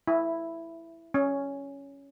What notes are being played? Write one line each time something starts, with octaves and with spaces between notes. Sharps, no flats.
E4
C#4